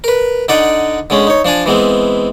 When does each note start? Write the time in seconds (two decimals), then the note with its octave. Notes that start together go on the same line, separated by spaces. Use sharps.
0.04 A#4 B4
0.48 D3 D#4 D5 D#5 F#5
1.10 D3 G#3 C#4
1.27 D#4 C#5
1.45 F3 D4 D5 G#5
1.66 E3 G#3 B3 C4